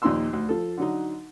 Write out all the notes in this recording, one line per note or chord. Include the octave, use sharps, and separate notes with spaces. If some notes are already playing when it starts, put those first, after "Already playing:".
D#2 A#2 F3 D#4 C6 E6
D2
F3 A4
D3 F#3 D#4